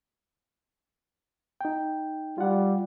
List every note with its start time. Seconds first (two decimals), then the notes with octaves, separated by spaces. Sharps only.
1.61 D#4 G5
2.38 G3 F4 F#5